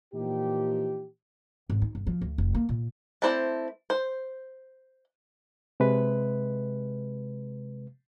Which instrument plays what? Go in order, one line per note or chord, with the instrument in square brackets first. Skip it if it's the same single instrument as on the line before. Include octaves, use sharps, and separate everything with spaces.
[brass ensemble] A#2 E3 F3 D#4 G4
[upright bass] G#1
D#4
G1
F3
D2
F1
A#3
A#2
[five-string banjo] A3 C4 E4 C5 D5
C5
[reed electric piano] C3 G#3 B4